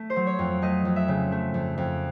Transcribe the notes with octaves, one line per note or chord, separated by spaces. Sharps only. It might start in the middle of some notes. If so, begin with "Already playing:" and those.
Already playing: A3
C5
F#3
C#5
F2
A3 D#5
F2
E5
C#3
A3
F2
F2